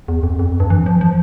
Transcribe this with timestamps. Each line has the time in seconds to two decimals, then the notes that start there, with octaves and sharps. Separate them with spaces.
0.08 E2
0.23 F2
0.39 F2
0.49 E2
0.60 G2
0.70 E3
0.86 F3
1.01 F3